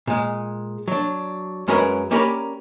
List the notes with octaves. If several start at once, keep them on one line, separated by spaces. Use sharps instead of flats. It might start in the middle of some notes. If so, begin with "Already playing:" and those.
A#2 G#3
F#3 D4
F#2 G#3 C#4 A#4 B4
A#3 C#4 G4 A#4 D5 B5